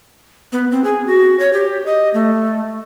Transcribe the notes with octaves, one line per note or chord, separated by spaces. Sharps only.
B3
C4
G#4
F#4
C#5
G4
D#5
A3